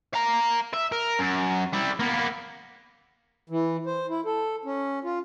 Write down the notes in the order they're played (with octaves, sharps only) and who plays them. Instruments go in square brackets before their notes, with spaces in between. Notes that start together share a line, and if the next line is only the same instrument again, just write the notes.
[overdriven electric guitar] F5 A#5
E5
A#4
F#2
G3 E4
A#3 B3
[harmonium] E3
C5
E4
A4
C#4
F4